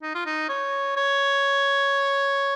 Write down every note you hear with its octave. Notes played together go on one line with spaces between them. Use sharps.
D#4
F4
D#4
C#5
C#5